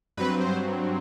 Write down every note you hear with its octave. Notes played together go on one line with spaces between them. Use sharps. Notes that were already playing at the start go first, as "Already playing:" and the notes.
G2 F#3 C4 B4
C5